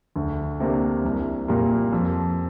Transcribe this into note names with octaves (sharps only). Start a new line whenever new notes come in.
D2
C3 A#3 D4
C2
A#2 G3 A#3
F2